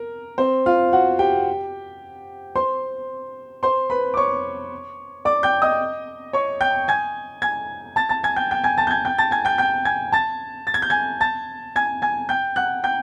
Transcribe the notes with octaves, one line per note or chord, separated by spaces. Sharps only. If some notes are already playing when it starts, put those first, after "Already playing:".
Already playing: A#4
C4 C5
F4 F5
F#4 F#5
G4 G5
C5 C6
C5 C6
B4 B5
D6
C#5 C#6
D5 D6
G5 G6
D#5 D#6
C#5 C#6
G5 G6
G#5 G#6
G#5 G#6
A5 A6
A5 A6
G#5 G#6
G5 G6
G5 G6
G#5 G#6
A5 A6
G6
G#5 G#6
G5 G6
A5 A6
G#5 G#6
G5 G6
G5 G6
G#5 G#6
A5 A6
A6
G#6
G6
G#5 G#6
A5 A6
G#5 G#6
G#5 G#6
G5 G6
F#5 F#6
G5 G6